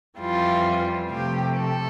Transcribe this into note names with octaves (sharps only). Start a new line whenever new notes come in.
F2 E3 G3 F4
C3 F3 A3 G4
A4